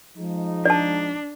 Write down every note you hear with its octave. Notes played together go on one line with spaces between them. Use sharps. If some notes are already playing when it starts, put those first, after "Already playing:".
F3 G#3 D#4
D4 D5 A5